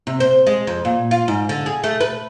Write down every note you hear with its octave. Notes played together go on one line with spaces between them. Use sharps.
C3
C5
G#3
F2
A#2
F4
G#2
D3
G#4
A3
B4